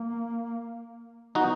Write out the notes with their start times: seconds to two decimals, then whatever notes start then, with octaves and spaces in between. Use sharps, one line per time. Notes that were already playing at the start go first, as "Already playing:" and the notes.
Already playing: A#3
1.35 B3 D#4 F#4